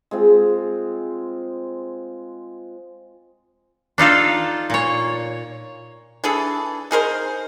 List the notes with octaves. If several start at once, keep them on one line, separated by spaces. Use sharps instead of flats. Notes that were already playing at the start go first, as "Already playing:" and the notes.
G#3 C4 F4
D4 D#4 F4 A4
A#2 C#5
E3 D4 G#4 A4
D#4 G#4 A#4 C5